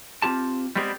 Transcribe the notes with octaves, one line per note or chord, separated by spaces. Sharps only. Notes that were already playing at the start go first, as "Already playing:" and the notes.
C4 F4 G4 A5
G3 G#3 B3 C4 G4 G#4